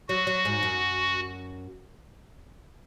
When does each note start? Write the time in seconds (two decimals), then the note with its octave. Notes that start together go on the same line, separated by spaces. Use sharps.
0.09 F#3 F#4
0.27 F#3
0.45 G#2
0.63 F#2